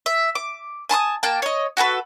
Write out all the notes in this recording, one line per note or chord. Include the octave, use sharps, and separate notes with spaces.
E5
D6
G#5 A5 C6 D#6
A#3 G5 A5
C#5 D#5
F#4 G#4 A4 B4